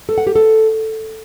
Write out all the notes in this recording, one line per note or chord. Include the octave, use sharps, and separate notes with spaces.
A4
F#5
G4
A4